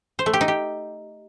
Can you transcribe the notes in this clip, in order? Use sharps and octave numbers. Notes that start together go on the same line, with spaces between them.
C5
A3
G4
D#4
G4